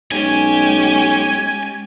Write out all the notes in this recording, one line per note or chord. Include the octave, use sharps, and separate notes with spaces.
B1 G#3 C#4 G4 G#5